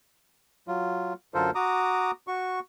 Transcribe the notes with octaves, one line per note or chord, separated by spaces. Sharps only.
F#3 F4
F#2 D3 F4 A4 A#4 C5
F#4 A#5 D6 D#6
F#4 C#6